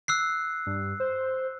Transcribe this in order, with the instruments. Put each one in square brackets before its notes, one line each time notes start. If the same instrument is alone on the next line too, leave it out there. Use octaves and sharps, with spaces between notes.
[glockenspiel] E6 F#6 C7
[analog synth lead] G2
C5